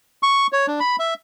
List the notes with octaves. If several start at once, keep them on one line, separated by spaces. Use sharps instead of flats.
C#6
C#5
D4
B5
E5